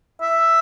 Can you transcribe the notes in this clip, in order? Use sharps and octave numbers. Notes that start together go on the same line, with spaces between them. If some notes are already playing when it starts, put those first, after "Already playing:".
E5